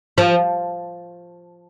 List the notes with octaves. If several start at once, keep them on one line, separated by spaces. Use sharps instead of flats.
F3